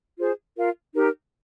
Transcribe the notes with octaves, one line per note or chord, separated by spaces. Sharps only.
F4 G#4 C5
F4 A#4 F5
D#4 G4 A#4